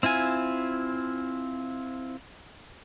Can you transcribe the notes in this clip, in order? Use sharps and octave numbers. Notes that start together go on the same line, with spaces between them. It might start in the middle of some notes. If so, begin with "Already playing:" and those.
C4 E4 F4 G#5